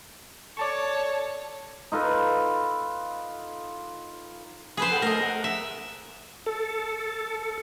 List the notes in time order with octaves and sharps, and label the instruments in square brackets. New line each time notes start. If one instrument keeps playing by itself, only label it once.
[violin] A4 C#5 [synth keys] D5 A5 C#6
[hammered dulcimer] D#4 F4 A4 B4
[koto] G#4 B4 C5 [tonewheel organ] B5
[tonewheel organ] A4 F#5 G5
[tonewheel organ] A3 A4 [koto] A#4 D#5
[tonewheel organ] F#5
[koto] E5
[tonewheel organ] A4